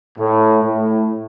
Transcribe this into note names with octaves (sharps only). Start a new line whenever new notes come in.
A2
A2